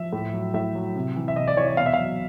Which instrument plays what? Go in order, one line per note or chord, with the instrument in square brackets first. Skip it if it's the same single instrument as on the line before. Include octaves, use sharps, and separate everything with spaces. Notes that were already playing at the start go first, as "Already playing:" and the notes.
Already playing: [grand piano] F3 E5
A2
F#3
A2 E5
F#3
C3
E3
E5
C3 D#5
D5
E3 C#5
D5
B2 F5
E5
F#3 F5